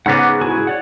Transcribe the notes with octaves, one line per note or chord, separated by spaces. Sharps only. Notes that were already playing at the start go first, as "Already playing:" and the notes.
G#2 C#3 B3 F#5 D6
E4 F#4 G#4
C#5 D5 F#5